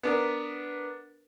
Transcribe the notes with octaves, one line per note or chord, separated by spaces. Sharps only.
B3 D4 A#4